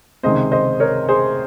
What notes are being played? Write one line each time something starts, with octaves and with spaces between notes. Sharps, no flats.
C#2 C3 D#3 G#3 C4 C5 D#5
C5 D#5
A#4 C#5
G#4 C5